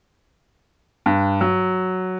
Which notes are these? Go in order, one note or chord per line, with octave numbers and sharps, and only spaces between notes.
G2
F#3